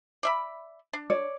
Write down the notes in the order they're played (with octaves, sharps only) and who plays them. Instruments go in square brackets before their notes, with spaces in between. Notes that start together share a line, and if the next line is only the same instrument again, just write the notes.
[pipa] D5 E5 B5
D4
[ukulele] C#5 D5